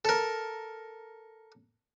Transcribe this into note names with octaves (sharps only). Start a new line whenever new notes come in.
A4 A#4